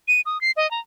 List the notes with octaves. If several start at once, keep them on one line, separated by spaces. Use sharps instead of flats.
D#7
D#6
C7
D#5
A#5